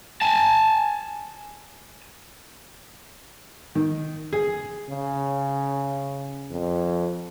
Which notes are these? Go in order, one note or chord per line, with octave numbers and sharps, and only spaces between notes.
G#5 A5
D#3
G#4
C#3
F2